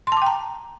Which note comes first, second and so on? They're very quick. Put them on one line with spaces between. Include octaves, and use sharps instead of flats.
C6 A5 D6 G5 A#5